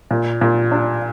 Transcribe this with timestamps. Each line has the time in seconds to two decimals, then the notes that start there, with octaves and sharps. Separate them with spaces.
0.11 A#2
0.41 A#2
0.71 D4